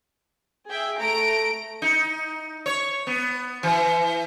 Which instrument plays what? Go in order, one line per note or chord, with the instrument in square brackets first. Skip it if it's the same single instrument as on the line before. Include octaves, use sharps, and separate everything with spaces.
[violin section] G#4 E5 G5
A3 A#5 D7
[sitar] D#4
C#5
B3
E3